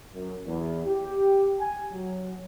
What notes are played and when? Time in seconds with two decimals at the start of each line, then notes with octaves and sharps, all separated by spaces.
0.14 F#2
0.47 E2
0.86 G4
1.60 G#5
1.93 F#3